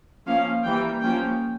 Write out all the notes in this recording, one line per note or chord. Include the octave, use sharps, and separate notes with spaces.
F3 A#3 C#4 F5
E3 G3 A#3 G5
F3 A#3 C#4 G5